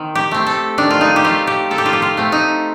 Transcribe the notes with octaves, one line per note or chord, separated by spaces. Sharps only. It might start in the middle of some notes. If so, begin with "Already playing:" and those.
Already playing: D#3 C4
G4
A3 C4
A4
D#3 D4
F4
D#4
G4
A3 C4 F4
G4
D#3 A4
G4
F4
G4
F4
A3 C4
D#4